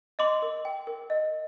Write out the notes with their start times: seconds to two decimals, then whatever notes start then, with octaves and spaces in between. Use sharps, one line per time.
0.19 D#5 C6 D6
0.42 A#4
0.65 G5
0.87 A#4
1.10 D#5